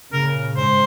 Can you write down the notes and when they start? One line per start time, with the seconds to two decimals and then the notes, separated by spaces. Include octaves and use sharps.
0.12 A#2 C#3 A#4
0.56 G#2 C5